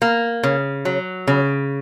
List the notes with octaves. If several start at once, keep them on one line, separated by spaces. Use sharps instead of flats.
A#3
C#3
F#3
C#3